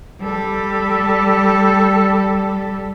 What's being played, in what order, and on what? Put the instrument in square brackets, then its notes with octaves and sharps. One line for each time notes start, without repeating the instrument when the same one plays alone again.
[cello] G3 A4